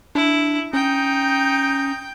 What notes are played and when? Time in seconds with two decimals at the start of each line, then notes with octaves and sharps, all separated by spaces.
0.15 D4 E4
0.73 C#4 D#4 G5